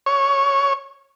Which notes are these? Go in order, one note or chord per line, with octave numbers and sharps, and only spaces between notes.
C#5